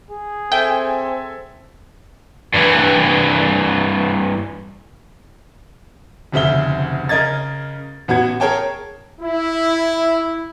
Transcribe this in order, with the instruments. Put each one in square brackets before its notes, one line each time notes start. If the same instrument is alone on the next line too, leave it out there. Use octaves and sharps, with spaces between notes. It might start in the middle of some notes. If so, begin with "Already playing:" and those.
[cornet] G#4
[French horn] C4 [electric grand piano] A4 E5 G#5 [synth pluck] G5
[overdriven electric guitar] G2 E3
[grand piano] F1 D2 C#3 E5 G7
C#3 A#4 D#5 G#6 A6
A1 B3 F#4 G#6
G#4 A#4 C#5 G5 A5
[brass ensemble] E4